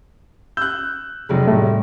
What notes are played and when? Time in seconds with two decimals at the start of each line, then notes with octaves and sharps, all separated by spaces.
0.57 E6 F#6 G6
1.29 F1 F#3 G#3
1.48 A2 G3 A3